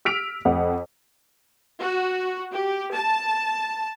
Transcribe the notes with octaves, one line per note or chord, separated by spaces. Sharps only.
E6 F6 B6 D7 F7
F2 F#5
F#4
G4
A5